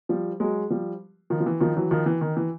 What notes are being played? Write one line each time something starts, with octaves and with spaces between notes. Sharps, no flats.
F3 G3
F#3 G#3
F3 G3
D#3 F3
F3
E3
D#3 F3
E3 F#3
D#3 F3
E3
D#3
E3